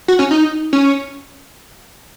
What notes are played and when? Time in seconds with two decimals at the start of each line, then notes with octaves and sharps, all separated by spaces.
0.08 F#4
0.19 C#4
0.31 D#4
0.73 C#4